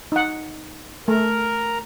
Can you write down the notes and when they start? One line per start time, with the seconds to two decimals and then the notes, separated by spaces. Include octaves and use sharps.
0.12 D#4 F#5
1.08 A3 A#4